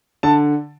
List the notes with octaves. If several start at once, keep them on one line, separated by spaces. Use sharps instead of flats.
D3 A5